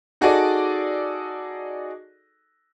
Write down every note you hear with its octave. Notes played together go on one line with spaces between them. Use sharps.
D#4 F#4 G#4 A4 D5 D#5